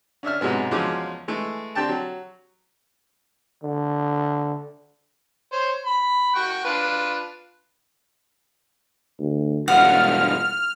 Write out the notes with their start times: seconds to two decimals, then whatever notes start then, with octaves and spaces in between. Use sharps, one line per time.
0.23 C#4 D4 E5 F6
0.41 G#2 C3 F#3 G#3 B3
0.71 E2 C#3 F3 F#3 G#3 D6
1.28 E3 G#3 A3
1.75 C4 D4 G4 G5 A5
1.89 F#3
3.63 D3
5.52 C5 C#5
5.86 B5
6.35 F#5 G5 C#6
6.65 D4 F4 B4
9.19 D2
9.68 E1 G2 G#3 F4 F#5 F6